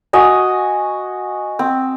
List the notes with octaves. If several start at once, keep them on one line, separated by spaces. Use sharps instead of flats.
F#4 D#5 G#5
C4